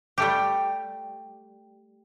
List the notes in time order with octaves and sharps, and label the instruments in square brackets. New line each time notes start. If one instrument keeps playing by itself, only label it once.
[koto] G3 A3 G4